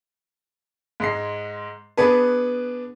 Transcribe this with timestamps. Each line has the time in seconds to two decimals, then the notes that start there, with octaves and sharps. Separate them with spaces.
1.00 G#2 G#3 C7
1.97 B3 D4 G#4 B4